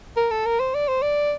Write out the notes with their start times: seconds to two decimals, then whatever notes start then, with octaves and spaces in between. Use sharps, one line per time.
0.16 A#4
0.31 A4
0.46 A#4
0.60 C5
0.74 D5
0.88 C5
1.02 D5